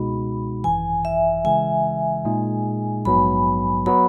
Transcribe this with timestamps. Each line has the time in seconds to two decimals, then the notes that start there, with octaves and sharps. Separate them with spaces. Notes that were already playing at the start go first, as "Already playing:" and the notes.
Already playing: C#2 B2 G#3 D#4 F#4 B5
0.64 G#1 F#2 E3 G#5
1.05 E5
1.45 C#3 E3 G#3 G#5
2.25 A#2 G#3 D#4 G#4
3.05 A#1 G#2 F#3 B3 B5
3.86 F#3 B3 F#4 B5